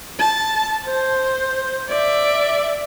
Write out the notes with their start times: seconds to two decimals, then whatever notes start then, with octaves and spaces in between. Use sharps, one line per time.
0.20 A5
0.85 C5
1.89 D5 E5